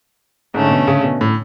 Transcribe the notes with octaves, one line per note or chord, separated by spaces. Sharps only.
G#2 D3 A3 C#4
B2
C#3
B2
A2